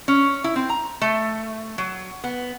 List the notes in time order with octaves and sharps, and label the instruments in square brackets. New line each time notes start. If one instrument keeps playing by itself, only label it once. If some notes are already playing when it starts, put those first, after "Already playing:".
[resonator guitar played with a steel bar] C#4
E4
C4
A#5
A3
F#3
B3